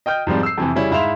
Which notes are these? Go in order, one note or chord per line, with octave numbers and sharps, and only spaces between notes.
D#5 G5 F6 G6
G#2 F3 G3 C4
E6 C7
F2 C3 E3
C#3 G3 C#4 E4
G#2 E4 E5 F5 C6 F7